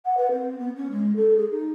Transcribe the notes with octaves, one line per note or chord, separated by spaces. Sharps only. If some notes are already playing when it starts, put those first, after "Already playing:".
F#5
B4
C4
B3
C#4
G#3
A4
G#4
D#4